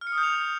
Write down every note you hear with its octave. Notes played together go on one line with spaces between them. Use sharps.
F6
C#7
D#6
G6
F7